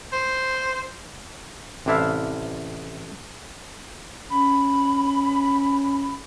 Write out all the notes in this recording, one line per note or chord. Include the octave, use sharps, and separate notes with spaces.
C5
A1 C3 D4 E4 E5 F5
C#4 B5